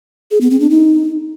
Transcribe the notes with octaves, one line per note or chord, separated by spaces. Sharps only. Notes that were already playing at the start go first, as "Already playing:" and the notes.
G#4
B3
C4
D4
D#4